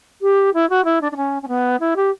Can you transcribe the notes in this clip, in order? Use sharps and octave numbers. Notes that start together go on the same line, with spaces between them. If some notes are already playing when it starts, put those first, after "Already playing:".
G4
E4
F#4
E4
D4
D4
C#4
C#4
B3
E4
G4